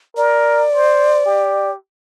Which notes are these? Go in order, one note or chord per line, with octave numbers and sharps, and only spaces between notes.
A#4 D5
C5
G4